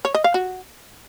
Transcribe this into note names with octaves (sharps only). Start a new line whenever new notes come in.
C#5
D#5
F5
F#4